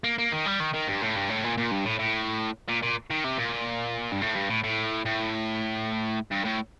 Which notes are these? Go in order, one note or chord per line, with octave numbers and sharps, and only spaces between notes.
A#3
A#3
D#3
G3
D#3
D#3
G2
A2
G2
A2
A#2
A#2
G2
A2
A2
A#2
A#2
D#3
C3
A#2
G2
A2
G2
A2
A2
A2
G2
A2